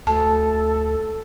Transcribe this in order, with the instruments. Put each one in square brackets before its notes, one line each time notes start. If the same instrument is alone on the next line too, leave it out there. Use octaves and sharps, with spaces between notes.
[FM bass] D2 [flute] A4 [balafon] A5